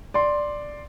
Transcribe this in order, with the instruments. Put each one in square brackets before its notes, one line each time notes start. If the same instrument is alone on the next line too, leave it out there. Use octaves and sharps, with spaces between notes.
[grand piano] D5 C6